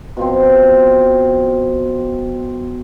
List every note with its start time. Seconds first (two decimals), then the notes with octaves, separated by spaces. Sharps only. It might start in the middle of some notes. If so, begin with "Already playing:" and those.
0.17 B2 F3 C4